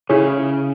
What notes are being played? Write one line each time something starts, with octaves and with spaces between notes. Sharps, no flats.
C#3 E4 G#4 C#5